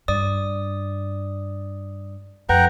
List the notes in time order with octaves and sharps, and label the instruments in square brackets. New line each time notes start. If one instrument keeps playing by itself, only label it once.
[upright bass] G2 [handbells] D5 D#6
[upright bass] F2 [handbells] B4 [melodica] F#5 G5 A#5